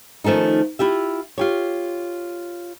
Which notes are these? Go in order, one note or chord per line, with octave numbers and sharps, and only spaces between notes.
D#3 F3 A3 C#4 D#4
E4 F4 G4 E5
F4 G4 C#5